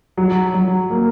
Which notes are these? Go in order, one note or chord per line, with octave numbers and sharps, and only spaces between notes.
F#3
F#3
A#3